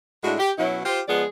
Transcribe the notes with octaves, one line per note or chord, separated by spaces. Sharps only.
A2 G#3 D4 E4 F#4
G4
B2 F#3 C#4 E4
F4 G4 C5
F3 G#3 B3 G#4 D5